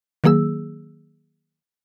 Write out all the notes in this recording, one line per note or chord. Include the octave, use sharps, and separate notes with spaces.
D#3 F#3 A#3 G#4 E6